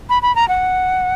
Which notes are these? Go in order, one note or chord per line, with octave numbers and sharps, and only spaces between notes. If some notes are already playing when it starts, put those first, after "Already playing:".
B5
B5
A#5
F#5